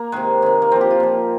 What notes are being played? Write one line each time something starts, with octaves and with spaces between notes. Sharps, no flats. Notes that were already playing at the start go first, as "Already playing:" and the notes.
Already playing: A#3
C3 D#3 G#3
C3 D#3
A#3
C3 F3 C4
G4
F4
A#2 F3